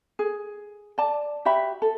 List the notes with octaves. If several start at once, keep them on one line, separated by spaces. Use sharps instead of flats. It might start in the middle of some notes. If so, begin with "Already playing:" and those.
G#4
D5 A5
F#4 G4 E5 B5
A4